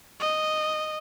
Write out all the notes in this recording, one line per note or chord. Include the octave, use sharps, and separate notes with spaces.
D#5